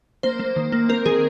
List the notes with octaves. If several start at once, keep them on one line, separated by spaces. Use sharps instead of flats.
A#3 C5
A#3
D#3
A#3
C4 A#4
D#3 G#4